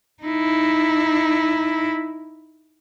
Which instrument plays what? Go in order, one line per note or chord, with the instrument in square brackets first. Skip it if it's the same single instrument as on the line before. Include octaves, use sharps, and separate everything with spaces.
[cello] D#4 E4